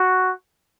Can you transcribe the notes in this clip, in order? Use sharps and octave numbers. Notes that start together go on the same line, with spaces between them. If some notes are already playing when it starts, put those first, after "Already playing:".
Already playing: F#4